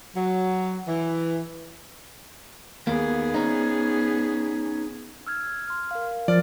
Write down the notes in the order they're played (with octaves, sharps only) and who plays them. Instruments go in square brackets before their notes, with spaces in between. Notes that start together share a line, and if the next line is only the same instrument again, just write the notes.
[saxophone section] F#3
E3
[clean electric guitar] D#2 A#3 [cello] B3 G#4
[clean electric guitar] C#4 D#4
[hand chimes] E6 F6 G#6
C6 F6
A#4 F5
[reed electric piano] F3 [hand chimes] A#4 F6 A6 [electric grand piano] D5